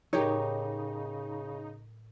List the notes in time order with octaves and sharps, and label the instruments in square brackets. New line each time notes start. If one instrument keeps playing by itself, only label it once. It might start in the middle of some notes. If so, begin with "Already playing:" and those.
[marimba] A2 A#4 A#5 [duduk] C#3 [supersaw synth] D#4 [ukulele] G4 C#5